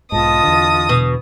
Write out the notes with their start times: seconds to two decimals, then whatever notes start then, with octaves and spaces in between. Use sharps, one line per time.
0.12 B1 G#2 F4 D#5 A5 D#6
0.43 E2 D3
0.89 B2